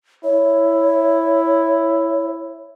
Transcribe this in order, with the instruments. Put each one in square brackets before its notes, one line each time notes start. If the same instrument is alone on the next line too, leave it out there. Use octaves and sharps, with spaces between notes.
[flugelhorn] E4 [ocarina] C#5